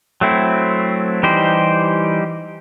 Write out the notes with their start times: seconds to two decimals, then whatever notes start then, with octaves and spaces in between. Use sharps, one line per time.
0.21 F#3 A3 C4 E4
1.23 E3 G3 D#4 G4 C5